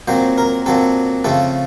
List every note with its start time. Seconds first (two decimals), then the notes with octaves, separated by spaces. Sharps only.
0.08 A#2 F#3 C4 C5
0.38 A#4
0.66 A#2 F#3 C4 A4
1.24 C#3 F3 A3 C4 A4